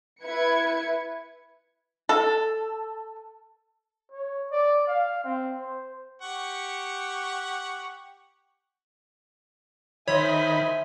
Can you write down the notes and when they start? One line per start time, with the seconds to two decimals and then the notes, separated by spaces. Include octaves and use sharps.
0.22 E4 B4 G#6 C#7
2.09 A4
4.12 C#5
4.52 D5
4.88 F5
5.24 C4
5.61 C5
6.22 G4 F#5 C#6
10.08 D#3 C5 C#5 E5 G#5 B5